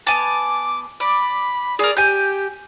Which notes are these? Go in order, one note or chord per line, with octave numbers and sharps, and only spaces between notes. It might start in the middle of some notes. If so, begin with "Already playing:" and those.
B3 G#5 A5 D6
D5 B5
G#4 A#4 D5
G4 G#5 G6